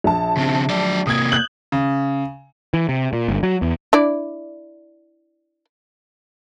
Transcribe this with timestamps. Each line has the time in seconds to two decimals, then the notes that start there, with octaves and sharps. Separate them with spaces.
0.04 A#1 A5
0.37 C#3 C4
0.70 F#3 D5
1.07 C3 A#3 D#6 G#6
1.32 F#6 G6 F#7
1.72 C#3
2.74 E3
2.89 C3
3.13 A#2
3.29 G1
3.43 F#3
3.62 E2
3.93 D4 E4 D5